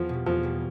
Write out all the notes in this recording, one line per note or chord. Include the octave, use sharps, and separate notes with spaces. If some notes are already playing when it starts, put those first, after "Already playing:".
Already playing: E2 F3 B3
B2 G3
E2 F3
B2 G3